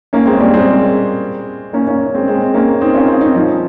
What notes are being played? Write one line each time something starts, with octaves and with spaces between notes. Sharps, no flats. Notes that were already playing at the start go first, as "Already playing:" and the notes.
A#3 C#4
G#3 C4
G3 A#3
G#3 C4
A#3 C#4
A#3 C#4
G#3 C4
G#3 C4
A#3 C#4
C4 D#4
C#4 F4
C4 D#4
C4 D#4
F3